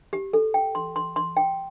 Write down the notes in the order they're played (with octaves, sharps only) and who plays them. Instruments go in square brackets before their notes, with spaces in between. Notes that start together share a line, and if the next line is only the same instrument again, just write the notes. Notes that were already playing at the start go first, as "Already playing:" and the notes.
[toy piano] G4
A4
G5
C6
C6
C6
G5